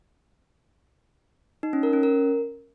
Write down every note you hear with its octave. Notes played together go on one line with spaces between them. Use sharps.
D#4
C#4
A#4
C#4
A#4